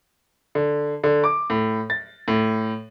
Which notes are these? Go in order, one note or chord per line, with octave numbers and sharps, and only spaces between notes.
D3
D3
D6
A2
A6
A2